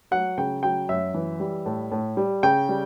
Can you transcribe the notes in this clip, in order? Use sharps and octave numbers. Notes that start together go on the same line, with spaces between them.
F#3 F#5
C#3 G5
F#3 G5
F#2 E5
E3
G3
A2
A2
G3
C#3 G5
G3